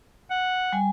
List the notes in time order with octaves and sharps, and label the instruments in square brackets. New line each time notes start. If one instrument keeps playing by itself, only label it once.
[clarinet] F#5
[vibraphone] G3 G#5